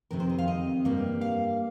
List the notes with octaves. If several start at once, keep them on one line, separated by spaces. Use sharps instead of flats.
F2 C3 D#3 C4 A#4
C5
D#5
F5
D#5
G2 G3 A#3
F5